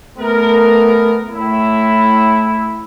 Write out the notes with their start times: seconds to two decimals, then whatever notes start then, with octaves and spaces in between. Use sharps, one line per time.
0.18 A3 B3 A#4
1.29 A2 E4